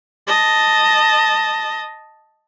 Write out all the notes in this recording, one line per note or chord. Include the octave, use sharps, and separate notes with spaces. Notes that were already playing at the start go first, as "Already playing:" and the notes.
D#5 A5